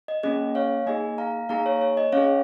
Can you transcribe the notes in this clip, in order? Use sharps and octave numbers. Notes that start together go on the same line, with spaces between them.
D#5
A#3 C#4 G#4 D#5
C#5 F5
A#3 D#4 G#4 D#5 G#5
F5 A#5
A#3 D#4 G#4 F5 A#5
C#5
C#5
D#5
C#4 G#4 C#5 F5